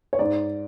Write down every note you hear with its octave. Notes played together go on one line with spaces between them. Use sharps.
C#5
G#2 D5